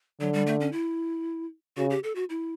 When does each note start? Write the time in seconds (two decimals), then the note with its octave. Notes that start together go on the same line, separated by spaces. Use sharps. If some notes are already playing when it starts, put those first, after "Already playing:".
0.20 D3 F#3
0.34 G3
0.47 A3
0.60 C#4
0.72 E4
1.77 C#3 F#4
1.90 G4
2.04 A4
2.15 F#4
2.30 E4